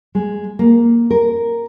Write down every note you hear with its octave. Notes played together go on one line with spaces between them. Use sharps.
G#3
A#3
A#4